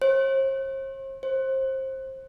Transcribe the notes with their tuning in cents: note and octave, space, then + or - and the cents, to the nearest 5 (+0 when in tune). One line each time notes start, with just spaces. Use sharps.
C5 +45
C5 +25